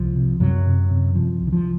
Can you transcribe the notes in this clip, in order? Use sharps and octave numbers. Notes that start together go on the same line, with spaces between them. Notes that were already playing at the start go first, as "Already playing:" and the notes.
Already playing: C2 F3
C3
F#2 C3 F#3
C3
C3
C3 F3
C2
D#3
F3